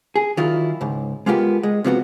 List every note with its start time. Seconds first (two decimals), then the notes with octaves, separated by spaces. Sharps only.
0.16 G#4
0.37 D#3 F#3 E4 F4
0.81 C#2 G#2
1.26 G#3 A#3 B3 F4 G4
1.63 G#3
1.84 C3 F3 B3 F#4